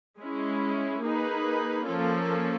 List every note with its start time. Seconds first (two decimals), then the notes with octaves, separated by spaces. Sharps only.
0.20 G#3 C#4 E4
1.03 A#3 D#4 G#4 B4
1.86 F3 A#3 C#4 F4 A4